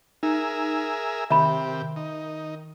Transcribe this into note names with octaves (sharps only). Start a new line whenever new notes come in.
D#4 G#4 A#4 E5
C3 D#3 G4 E5 B5
D#4